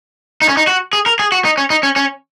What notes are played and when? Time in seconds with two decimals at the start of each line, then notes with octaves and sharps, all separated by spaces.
0.42 D#4
0.49 C#4
0.57 D#4
0.67 F#4
0.93 G#4
1.06 A#4
1.19 G#4
1.32 F#4
1.45 D#4
1.58 C#4
1.70 D#4
1.83 C#4
1.96 C#4